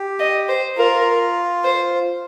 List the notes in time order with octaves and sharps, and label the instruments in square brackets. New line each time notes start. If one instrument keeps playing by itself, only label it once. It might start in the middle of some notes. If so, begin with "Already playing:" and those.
Already playing: [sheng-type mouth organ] G4
[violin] D#5
C5
[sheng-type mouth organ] F4 [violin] A#4
[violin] C5